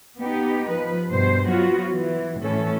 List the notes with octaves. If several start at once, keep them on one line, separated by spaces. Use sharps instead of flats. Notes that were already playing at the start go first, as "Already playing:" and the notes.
B3 D#4 G4
F3 B4
G2 B2 C5
F#3 B3 F4 F#4
E3
A2 E3 C#4 A4